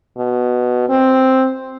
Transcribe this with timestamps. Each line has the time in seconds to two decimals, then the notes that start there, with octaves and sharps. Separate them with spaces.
0.17 B2
0.89 C4